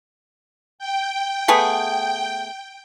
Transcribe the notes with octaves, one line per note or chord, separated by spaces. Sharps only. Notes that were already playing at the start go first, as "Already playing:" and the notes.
G5
A3 B3 G#4